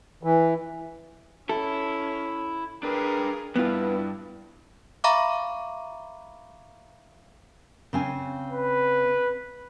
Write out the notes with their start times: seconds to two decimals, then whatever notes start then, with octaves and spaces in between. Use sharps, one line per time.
0.23 E3
1.49 C#4 E4 A4
2.83 D4 G#4 A#4 B4
3.56 G2 B3 E4 F4
5.04 E5 F5 A#5 B5 C#6 D6
7.93 C#3 C4 G#5
8.50 B4